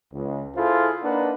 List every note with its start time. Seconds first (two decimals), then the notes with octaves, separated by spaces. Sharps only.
0.13 C#2
0.56 E4 F4 G#4 A4 C5
1.03 A#3 D4 D#4 B4 F#5